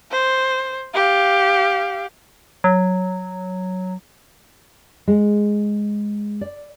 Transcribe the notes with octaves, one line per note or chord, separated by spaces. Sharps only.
C5
G4 F5
F#3
G#3
D5